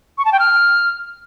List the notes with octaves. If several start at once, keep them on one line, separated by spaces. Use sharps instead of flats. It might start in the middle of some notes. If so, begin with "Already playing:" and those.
C#6
A5
G5
F6